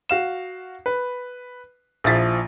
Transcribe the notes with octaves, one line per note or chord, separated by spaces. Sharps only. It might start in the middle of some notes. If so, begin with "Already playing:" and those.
F#4 F5 E7
B4
A#1 F3 E4 A6 B6